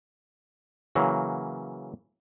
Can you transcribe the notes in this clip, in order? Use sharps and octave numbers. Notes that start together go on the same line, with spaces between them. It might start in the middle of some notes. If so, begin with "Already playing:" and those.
C#3 E3 F#3 A#3